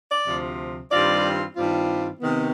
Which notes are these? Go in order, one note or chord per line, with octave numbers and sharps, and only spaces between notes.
D5
D2 C3 F3
G2 D#3 G3 C4 F4 D5
G2 D#3 G3 C4 F4
C3 D#3 B3